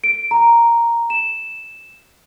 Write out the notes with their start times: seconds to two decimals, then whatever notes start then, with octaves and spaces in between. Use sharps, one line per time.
0.04 D7
0.31 A#5
1.10 E7